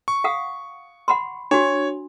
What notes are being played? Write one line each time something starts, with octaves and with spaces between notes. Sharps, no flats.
C#6
F5 F#5 D#6
F#5 B5 C6
D4 F#4 C#5